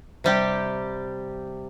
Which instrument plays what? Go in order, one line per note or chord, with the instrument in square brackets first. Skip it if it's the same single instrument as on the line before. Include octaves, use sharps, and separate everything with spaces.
[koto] C3 G3 G4